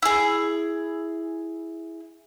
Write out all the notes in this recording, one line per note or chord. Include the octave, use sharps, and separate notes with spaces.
E4 G#4